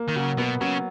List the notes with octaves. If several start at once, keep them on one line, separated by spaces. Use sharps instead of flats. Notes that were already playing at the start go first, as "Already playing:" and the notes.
Already playing: A#3
D#3
C#3 F#3
B2 B3
C#3 F#3